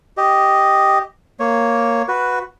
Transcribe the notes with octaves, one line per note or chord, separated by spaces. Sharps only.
G4 D#5
A#3 C#5
F#4 B4